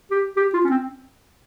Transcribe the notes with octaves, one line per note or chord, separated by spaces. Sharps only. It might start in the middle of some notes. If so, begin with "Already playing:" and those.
G4
G4
F4
C#4
C4